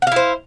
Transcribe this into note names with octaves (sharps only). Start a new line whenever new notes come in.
E4 C5 F5 F#5